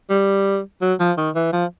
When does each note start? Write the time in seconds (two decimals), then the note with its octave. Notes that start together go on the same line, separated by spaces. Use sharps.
0.10 G3
0.82 F#3
1.00 F3
1.18 D#3
1.36 E3
1.53 F3